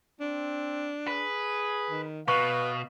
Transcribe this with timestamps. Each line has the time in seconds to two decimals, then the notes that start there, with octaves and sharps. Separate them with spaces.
0.20 C4 D4
1.07 G#4 B4
1.90 D#3
2.28 B2 B4 F5 C#6